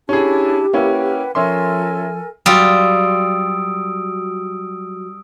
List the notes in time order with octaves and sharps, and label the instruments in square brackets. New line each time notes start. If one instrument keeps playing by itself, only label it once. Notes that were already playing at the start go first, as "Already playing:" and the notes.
[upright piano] C#4 G#4 [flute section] D4 E4 A5 [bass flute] G4
[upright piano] A#3 C#4 E4 [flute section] B4 F#5 G5
[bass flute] F3 [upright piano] C#4 E5 C6 [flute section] A4 A#4 G#5
[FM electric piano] F#3 F#4 [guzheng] G3 F4 [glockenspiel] D#6 E6 D7